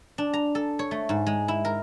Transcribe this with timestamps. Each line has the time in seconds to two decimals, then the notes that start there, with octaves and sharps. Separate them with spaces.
0.18 D4
0.34 A#5
0.55 A4
0.79 C#5
0.91 A3
1.09 G#2
1.26 G#3
1.48 E4
1.65 A#4